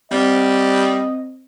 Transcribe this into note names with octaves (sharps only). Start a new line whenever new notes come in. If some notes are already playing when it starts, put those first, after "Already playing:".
G3 C4 D#5